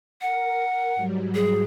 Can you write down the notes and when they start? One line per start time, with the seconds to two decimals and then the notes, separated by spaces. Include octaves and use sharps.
0.22 A#4 F#5
0.95 G#2 F#3 G3
1.35 G#4